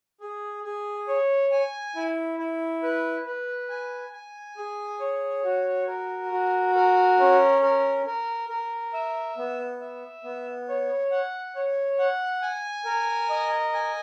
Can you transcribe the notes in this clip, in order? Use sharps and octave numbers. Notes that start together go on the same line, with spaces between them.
G#4
G#4
C#5
G#5
E4
E4
B4
B4
G#5
G#5
G#4
C#5
F#4
A#4
F#4
A#4
C#4
A#4
A#4
A#4
E5
B3
E5
B3
C#5
F#5
C#5
F#5
G#5
A#4
D#5
G#5